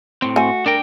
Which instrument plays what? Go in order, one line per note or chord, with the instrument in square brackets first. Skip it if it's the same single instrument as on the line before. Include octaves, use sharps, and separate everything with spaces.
[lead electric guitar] A2 C4
[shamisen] A3 G#5 [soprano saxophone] F#4
[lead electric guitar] D4 G5 [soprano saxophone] A#4